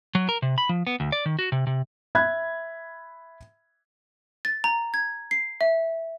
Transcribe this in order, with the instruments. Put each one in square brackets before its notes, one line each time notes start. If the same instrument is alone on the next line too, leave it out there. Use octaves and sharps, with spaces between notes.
[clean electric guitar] F#3
A#4
C3
B5
F3
B3
D2
D5
D#3
F#4
C3
C3
[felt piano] E5 B5 F#6 G#6
[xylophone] A6
A#5
G#6
C7
E5